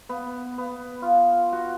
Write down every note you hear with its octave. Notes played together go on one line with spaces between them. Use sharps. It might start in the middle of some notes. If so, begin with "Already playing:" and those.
B3
B3
F4
F#4